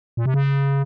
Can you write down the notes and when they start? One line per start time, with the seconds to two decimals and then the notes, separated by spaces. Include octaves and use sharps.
0.17 A#2
0.26 C3
0.34 C#3